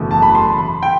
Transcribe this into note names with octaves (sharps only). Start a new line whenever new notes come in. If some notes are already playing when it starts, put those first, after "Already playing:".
Already playing: F#1 E2 B2 A3
A5
B5
C6
B5
G5